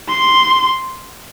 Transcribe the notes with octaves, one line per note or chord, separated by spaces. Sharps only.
C6